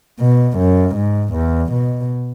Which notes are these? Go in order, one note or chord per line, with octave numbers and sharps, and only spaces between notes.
B2
F#2
G#2
E2
B2